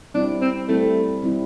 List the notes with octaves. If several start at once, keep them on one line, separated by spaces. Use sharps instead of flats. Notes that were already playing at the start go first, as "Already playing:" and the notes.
G3 C4 D4 E4
C4
G3 A3 C4 E4
G3 C4 E4